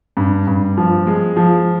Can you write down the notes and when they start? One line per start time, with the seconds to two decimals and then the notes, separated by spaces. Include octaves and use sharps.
0.17 G2
0.47 G2
0.77 F3
1.07 G#3
1.37 F3